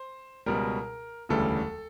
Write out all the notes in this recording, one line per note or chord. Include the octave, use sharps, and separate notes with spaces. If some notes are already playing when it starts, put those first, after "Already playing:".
Already playing: C5
C#2 B2 G3 A#4
E1 D2 C#3 E3 G3 A4